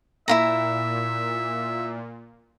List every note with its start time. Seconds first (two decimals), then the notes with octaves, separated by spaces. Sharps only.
0.28 A#2 E4 F4 E5 A#5